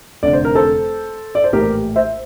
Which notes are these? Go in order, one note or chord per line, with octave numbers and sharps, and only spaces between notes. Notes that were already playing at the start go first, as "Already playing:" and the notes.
F1 F2 D3 D5
C5
A#4
A4 C5
D5
C5
A#1 A2 E3 G4 A#4
C5 E5